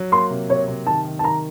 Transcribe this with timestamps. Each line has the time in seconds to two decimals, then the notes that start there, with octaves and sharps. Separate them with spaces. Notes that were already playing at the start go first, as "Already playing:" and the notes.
Already playing: F#3
0.12 A#3 C6
0.31 C3
0.49 C3 C#5
0.68 C3
0.86 D#3 A5
1.05 D#3
1.19 A5
1.24 D#3 A#5